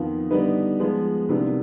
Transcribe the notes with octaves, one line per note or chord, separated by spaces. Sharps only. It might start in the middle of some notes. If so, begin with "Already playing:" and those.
Already playing: F2 D#3 B3 F4
D3 G3 B3 D#4 B4
F3 G#3 B3
C2 C3 D#3 B3 D4